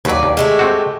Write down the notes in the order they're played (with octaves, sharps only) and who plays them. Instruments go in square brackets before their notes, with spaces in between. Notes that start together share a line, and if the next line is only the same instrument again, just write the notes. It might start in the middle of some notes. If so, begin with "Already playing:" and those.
[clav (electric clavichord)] D#2 F#3 [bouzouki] B4 D5
[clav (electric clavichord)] D#2
[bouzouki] G#3 A3 G4
[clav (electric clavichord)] C4 F#4